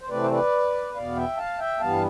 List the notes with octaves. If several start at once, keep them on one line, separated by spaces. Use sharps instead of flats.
C5
C3 E3 A3 C4 B4 D5
C5
B4 D5
E2 B2 B3 D5 F5
E5 G5
F5 A5
E5 G5
G2 E3 G3 B3 F5 A5